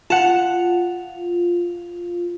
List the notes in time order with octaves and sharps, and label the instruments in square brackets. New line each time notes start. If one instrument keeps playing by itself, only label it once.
[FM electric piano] F4 [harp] F#5 A5